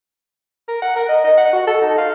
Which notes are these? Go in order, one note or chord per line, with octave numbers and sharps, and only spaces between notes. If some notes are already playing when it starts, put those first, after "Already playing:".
A#4
F#5
A#4
D#5
D#5
F#5
F#4
A4
D#4
F5